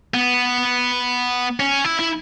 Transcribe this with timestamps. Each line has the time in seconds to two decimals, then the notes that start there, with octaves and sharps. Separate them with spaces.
0.14 B3
1.60 C#4
1.84 E4
1.99 E4